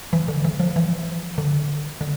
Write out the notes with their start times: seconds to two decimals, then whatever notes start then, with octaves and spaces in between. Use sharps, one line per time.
0.13 E3
0.28 D3
0.45 E3
0.60 F3
0.76 E3
1.38 D3
2.01 D3